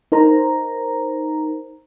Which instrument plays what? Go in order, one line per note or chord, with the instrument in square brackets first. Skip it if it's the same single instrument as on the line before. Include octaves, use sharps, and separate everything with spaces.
[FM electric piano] D#4 A#4 C5 A#5